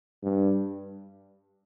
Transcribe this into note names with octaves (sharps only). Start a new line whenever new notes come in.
G2